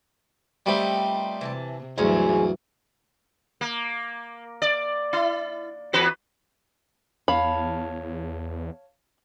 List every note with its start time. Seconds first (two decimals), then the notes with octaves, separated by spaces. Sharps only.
0.66 G3 A3 B3 C4 D#4 F4
1.41 C3 E3 E5 A5
1.98 D2 G2 E3 F#3 G#3 C#4
3.61 A#3
4.62 D5
5.13 E4
5.93 E2 F#4 B4
7.28 E2 C#5 F5 A5 B5